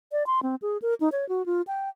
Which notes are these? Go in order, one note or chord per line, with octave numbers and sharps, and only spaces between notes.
D5
C6
C4
G#4
A#4
D#4
C#5
F#4
F4
G5